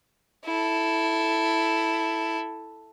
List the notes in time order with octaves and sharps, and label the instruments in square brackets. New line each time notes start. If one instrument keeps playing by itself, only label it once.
[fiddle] E4 A4